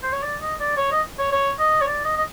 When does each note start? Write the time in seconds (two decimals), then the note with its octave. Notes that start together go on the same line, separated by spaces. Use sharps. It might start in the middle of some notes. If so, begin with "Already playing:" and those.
0.03 C5
0.13 C#5
0.23 D5
0.42 D#5
0.60 D5
0.77 C#5
0.92 D#5
1.19 C#5
1.32 C#5
1.59 D#5
1.82 C#5
1.87 D5
2.05 D#5
2.17 D#5